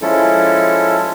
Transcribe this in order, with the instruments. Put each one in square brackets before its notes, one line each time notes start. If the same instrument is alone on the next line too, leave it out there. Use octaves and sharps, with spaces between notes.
[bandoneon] F3 G#3 C#4 E4 A4